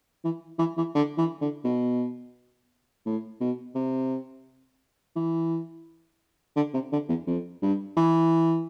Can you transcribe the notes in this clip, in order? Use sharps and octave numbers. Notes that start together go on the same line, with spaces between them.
E3
E3
E3
D3
E3
D3
B2
A2
B2
C3
E3
D3
C3
D3
E2
F2
G2
E3